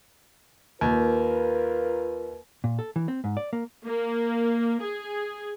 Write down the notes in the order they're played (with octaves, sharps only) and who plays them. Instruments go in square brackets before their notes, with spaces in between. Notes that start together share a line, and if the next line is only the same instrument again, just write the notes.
[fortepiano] D#2 [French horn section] F4 A#4 B4
[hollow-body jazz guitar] A#2
A4
E3
C4
G#2
D5
A#3
[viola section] A#3
G#4